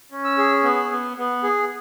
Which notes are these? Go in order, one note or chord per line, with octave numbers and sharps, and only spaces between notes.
C#4
E6
G#4
B3
B3
B3
G#4